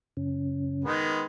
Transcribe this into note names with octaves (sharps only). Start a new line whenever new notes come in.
F#2 C#3 C#4
D#3 G#3 B3